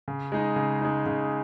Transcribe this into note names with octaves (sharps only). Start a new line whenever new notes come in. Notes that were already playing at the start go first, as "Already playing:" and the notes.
C#3
G#3 D#4
C#3
G#3 D#4
C#3